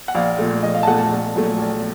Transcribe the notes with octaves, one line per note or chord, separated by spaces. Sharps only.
F#5
A#1 F5
A#2 A3
A#1 D#5
F5
A5
A#2 A3 F#5
A5
A#1
A#2 F#3 A3
A#1